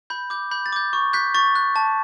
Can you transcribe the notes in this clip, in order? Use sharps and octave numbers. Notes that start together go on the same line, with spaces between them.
B5 G6
D6 G6
B5 G6
A6
D6 G6
C#6
F#6 G6 B6
C#6 A6
F#6
A5